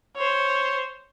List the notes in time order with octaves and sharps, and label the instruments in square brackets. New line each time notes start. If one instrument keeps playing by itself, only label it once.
[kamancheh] C5 C#5